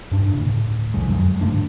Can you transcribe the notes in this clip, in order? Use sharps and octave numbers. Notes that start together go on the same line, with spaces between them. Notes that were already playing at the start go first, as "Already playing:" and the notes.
G2 D4
D2 A2 C#3
C2 F2 D3 G#3
F#2 F#3 G#3
G#2 D3 A3 D4